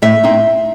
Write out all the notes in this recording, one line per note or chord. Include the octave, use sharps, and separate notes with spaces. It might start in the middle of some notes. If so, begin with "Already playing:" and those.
A2 E5
C4 D#4